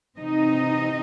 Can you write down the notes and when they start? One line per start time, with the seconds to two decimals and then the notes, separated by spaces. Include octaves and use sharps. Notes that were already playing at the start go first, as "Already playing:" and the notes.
0.18 C3 E3 C4 D#4 D#5